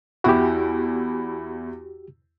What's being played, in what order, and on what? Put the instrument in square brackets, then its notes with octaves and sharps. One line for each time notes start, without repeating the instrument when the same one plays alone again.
[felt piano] E2 E4 [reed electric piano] F#4 G4